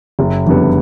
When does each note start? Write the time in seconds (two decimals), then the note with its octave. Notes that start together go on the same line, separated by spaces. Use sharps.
0.19 F#1
0.46 F2 D3 G3 B3